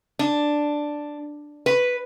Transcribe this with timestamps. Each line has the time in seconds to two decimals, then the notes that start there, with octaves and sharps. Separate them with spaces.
0.19 D4
1.66 B4